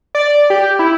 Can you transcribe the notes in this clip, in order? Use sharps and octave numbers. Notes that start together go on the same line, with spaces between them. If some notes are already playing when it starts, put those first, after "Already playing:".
D5
G4
E4